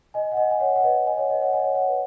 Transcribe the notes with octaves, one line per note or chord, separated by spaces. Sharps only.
D#5 G#5
F#5
D#5 G#5
G#5
C#5 F#5
F#5
B4 D#5
D#5 G#5
C#5 F#5
B4 D#5
C#5 F#5
D#5 G#5
C#5 F#5
C#5 F#5
B4